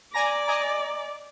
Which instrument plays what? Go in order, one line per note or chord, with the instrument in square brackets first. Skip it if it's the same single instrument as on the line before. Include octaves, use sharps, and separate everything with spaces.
[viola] D5 [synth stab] G#5 A#5 A#6
[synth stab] D#5 G#5 A#5